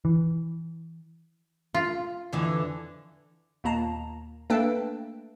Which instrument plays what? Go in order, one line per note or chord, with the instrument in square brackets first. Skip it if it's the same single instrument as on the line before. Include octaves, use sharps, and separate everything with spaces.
[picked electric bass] E3
[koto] F4
[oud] F2 D3 E3
[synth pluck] D#2 A#2 A#3 A5 A#5
A3 A#3 D4 A4 B4 G5